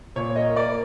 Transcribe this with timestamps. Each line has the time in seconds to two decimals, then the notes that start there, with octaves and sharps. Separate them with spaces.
0.16 A#2 C#5
0.36 A#3 D#5
0.56 A#3 D5